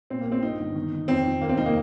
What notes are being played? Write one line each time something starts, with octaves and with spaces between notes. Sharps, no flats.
A#2 C4
A#3
A#1
C4
G2 D#4
G1
D#3
D#3
F2 C4
D#3
D#2 A#3
C4
F1 D#4
A#3